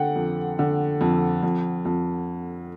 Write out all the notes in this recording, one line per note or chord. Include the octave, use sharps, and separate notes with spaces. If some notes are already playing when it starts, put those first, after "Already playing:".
Already playing: D3 F#5 G5
F2
D3
F2
F2
F2